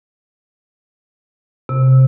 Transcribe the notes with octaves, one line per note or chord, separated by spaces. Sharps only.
C3